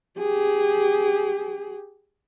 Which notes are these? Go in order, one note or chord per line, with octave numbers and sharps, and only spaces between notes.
G4 G#4